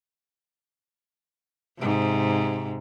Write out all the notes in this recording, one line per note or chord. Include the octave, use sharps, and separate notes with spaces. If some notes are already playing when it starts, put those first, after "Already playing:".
G#2 C3